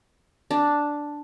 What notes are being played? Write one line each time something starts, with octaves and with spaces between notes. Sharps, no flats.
D4